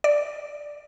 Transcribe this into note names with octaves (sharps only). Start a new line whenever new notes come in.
D5